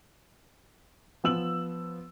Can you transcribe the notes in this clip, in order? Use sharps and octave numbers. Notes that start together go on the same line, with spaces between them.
F3 B3 E6 F#7